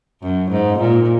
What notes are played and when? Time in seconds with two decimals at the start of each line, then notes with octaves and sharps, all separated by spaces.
0.22 F#2
0.51 G#2
0.79 A#2